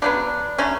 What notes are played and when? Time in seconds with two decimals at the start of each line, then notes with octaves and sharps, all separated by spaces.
0.02 C#3 F#3 B3 D4
0.58 D3 F#3 A3 C#4